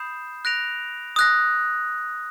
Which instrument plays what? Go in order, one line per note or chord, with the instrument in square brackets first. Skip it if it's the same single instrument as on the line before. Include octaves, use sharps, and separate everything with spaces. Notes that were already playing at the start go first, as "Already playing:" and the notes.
Already playing: [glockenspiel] B5 D#6 G6 C7 E7
F#6 A#6 D7 F7
D#6 F#6 A#6